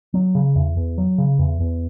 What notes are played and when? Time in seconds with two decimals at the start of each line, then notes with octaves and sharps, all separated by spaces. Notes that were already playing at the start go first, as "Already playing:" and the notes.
0.14 F#3
0.35 C#3
0.55 E2
0.77 E2
0.98 F#3
1.18 C#3
1.39 E2
1.60 E2